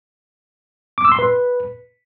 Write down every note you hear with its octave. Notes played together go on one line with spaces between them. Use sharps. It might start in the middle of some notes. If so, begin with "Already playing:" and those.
D6
E6
C6
B4